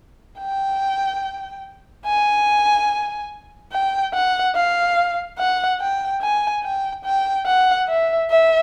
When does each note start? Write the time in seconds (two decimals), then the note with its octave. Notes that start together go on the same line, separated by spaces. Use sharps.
0.39 G5
2.06 G#5
3.72 G5
4.14 F#5
4.56 F5
5.39 F#5
5.80 G5
6.22 G#5
6.64 G5
7.05 G5
7.46 F#5
7.88 E5
8.30 E5